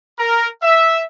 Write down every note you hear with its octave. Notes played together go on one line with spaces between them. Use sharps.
A#4
E5